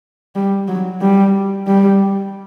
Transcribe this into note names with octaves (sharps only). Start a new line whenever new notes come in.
G3
F#3
G3
G3